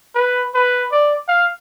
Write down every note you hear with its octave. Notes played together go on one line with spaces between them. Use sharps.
B4
B4
D5
F5